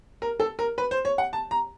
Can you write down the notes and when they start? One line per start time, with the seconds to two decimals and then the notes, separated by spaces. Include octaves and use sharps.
0.22 A#4
0.40 A4
0.59 A#4
0.78 B4
0.91 C5
1.05 C#5
1.18 F#5
1.33 A5
1.51 A#5